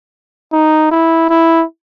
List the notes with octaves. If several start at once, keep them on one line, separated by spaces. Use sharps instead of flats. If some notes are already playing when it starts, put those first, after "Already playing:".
D#4
E4
E4